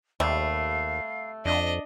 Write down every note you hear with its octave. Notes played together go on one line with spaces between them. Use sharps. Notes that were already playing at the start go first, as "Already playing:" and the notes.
D#2 C3 G3 A3 F5 B5
F2 D4 D#5